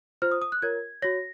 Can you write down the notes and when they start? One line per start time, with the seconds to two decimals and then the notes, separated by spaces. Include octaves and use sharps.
0.22 F4 C5 F6
0.31 D#6
0.42 D#6
0.52 F#6
0.62 F4 A#4 C#5 G#6
1.02 F#4 C#5 A#6